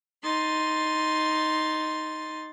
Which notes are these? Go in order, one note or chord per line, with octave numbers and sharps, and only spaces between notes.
D#4 C6 A6